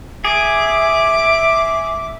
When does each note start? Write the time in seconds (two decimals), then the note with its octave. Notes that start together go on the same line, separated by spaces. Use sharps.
0.25 G#4 E5 D6